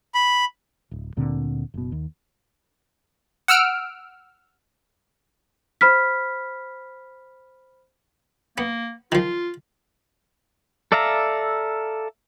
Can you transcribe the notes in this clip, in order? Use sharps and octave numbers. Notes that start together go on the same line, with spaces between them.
B5
D1
D2 A#2 D3 C4
F#1 B2
D#2
F#5 E6 F6 D7
C5 B5 F6 B6
A#3 B3
D#3 F3 F4
A4 D5 E5 F5 A#5